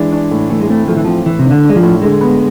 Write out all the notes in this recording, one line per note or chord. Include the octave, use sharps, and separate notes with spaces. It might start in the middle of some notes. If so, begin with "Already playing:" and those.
Already playing: E3 G#3 D4
D4
A2
E3 A3
G#3
A3 C4
F3 A3
E3
F3 C4
A2 E3
C3
D4
D3
D4
G#3
F3
A2
D3 G#3
B3